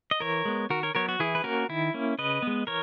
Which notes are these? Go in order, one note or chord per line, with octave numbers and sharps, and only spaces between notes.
D#5
E3 A#4 C#5
G#3 B3
D#3 F#4 A#4
A#4 C#5
F#3 B3 A#4 C#5
F#4
E3 E4 G#4
B4
A#3 C#4 F#4 A#4
D#3 E4
A#3 C#4
C#3 B4 D#5
G#3 B3
E3 A#4 C#5